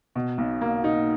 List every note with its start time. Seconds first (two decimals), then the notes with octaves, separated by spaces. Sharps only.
0.16 B2
0.38 B1
0.61 A#3
0.84 D#4